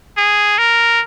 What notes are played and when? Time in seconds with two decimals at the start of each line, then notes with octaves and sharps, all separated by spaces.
0.18 G#4
0.58 A#4